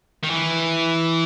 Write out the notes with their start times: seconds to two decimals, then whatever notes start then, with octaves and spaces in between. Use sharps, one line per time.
0.24 D#3
0.30 E3